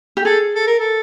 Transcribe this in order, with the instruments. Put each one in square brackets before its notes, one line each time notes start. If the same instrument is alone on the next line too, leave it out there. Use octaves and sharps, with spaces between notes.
[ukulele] G4
[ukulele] G#4 [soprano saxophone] A4
[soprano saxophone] A4
A#4
A4